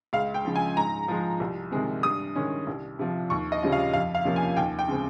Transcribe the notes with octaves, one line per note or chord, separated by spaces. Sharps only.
C#2 F5
G5
C#3 F3
G#5
G#2 A#5
F3 G#3
C2
C3 D#3 G#3 C4
G2 D#6
D#3 G#3 C#4
C2
C3 F3
D#2 C#6
D#5
C#3 G3 C#4 F4
F5
F2 F5
F5
C3 F3 A#3 C#4
G#5
D#2 G5
G5
C#3 G#3 C4